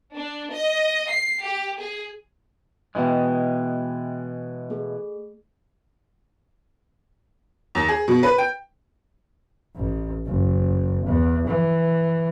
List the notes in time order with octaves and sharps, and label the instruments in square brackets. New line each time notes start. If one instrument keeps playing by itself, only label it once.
[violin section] D4
D#5
C7
G4
G#4
[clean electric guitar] B2 E3 G#3 [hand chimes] D#5 E5 G5
[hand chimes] A3 G#4
[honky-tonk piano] D#2
G#4
B2
B4
G5
[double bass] A1
F#1
E2
E3